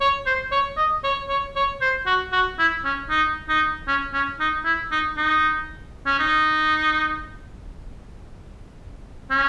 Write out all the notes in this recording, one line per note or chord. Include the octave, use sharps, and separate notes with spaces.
C#5
C5
C#5
D#5
C#5
C#5
C#5
C5
F#4
F#4
E4
C#4
D#4
D#4
C#4
C#4
D#4
E4
D#4
D#4
C#4
D#4
C#4